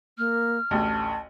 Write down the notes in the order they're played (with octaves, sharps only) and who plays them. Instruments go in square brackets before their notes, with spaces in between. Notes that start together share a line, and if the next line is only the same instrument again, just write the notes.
[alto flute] A#3 [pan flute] F6
[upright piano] A1 D2 [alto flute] A5